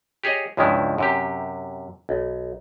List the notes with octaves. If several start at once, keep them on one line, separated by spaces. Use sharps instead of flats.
G4 G#4 C#5 D#5
C#2 G2 C#3 F3 G#3 E4
F#2 C3 G4
B1